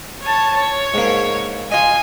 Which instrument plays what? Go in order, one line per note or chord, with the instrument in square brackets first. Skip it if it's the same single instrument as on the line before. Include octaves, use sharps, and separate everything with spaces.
[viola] C#5 A5
C#5
[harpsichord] G#2 A#3
[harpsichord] F4 D#5 [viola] G#5